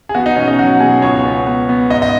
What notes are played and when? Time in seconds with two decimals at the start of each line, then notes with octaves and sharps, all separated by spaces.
0.09 G#4
0.15 B3 F#4
0.26 D#4
0.36 B2 C#4
0.48 D#4
0.58 F#3 F#4
0.80 B2 G#4
1.02 C#2 C#5
1.25 B3
1.47 B3
1.69 B3
1.90 G#2 D#5
2.02 D#5